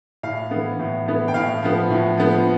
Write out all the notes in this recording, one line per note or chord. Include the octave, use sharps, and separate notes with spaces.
A2 F5
E3 B3
A2
E3 B3
G5
A2 F5
F3 B3
A2
F3 B3